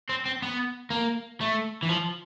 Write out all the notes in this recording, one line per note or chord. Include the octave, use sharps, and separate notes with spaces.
C4
C4
B3
A#3
A3
E3
F3